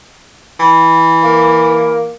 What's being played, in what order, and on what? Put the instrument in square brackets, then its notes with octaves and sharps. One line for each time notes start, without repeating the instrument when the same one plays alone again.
[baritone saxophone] E3
[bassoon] A#3